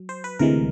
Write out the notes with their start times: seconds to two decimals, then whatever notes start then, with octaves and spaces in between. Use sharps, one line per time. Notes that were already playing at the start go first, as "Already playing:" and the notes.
Already playing: F#3
0.09 C5
0.24 B4
0.39 D2 C3 E3 G#3 A#4